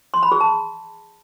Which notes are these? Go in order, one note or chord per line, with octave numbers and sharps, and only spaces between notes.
C6
B5
G#4
A5